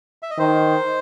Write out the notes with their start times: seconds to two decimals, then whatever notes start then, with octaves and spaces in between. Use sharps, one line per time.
0.23 E5
0.31 D#5
0.39 D#3 C5